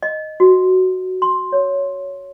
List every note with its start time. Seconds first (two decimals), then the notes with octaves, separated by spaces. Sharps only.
0.03 D#5
0.40 F#4
1.22 C6
1.52 C#5